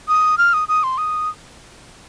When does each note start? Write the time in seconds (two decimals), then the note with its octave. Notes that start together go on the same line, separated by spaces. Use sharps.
0.08 D#6
0.38 F6
0.53 D#6
0.68 D#6
0.83 C6
0.98 D#6